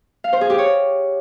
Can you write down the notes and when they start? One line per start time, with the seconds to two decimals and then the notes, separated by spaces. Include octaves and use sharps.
0.24 F5
0.33 C5
0.41 G#4
0.50 G4
0.58 C#5